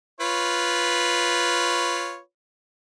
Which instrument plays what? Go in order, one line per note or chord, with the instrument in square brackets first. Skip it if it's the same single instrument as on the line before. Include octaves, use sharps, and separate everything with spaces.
[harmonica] F4 B4 C#5